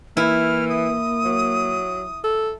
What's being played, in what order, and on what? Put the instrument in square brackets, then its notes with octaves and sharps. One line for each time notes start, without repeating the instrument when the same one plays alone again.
[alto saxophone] E3 [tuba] A#3 [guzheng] E4 [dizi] F6
[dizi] D#6
[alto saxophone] F#3
A4